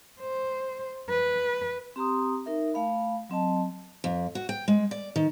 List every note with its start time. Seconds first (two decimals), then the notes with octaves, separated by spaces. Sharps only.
0.21 C5
1.10 B4
1.96 C4 G4 A#5 C6 D#6
2.46 D#4 A#4 E5
2.74 A3 F5 B5
3.30 F#3 C4 D#5 A5
4.04 F2
4.35 F#4
4.49 G5
4.68 G#3
4.91 D5
5.16 D#3